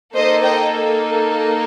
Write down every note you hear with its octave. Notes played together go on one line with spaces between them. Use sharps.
A#3 D#4 A4 C5 D#5
D#5 G5